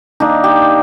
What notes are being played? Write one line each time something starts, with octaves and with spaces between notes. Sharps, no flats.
D#3 A#3 D4 D#4
G4